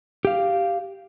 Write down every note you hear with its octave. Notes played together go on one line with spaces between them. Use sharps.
G4 F5